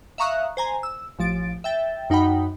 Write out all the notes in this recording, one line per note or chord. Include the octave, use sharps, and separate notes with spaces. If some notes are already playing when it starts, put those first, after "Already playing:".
E5 F5 A#5 C#6 D#6 F#6
C5 G#5 A#5
E6
A1 F3 A6 D7
E5 G5 A6
F#2 D#4 F#5 G5 B5